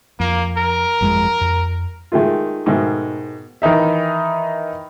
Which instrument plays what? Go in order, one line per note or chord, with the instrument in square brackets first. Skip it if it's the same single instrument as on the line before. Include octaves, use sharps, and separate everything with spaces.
[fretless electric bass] F2 [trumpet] A#3
[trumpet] A#4
[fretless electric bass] G1 F2 G#3
F2
[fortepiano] D#3 G#3 A3 F4
G#2 B2 D#3 A3
D#3 E3 D#4 E5